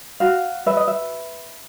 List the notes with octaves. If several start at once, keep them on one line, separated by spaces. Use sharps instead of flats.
F#4 F5
B4 E5
D#5
E5